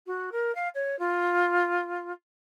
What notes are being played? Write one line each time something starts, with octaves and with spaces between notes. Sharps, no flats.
F#4
A#4
F5
C#5
F4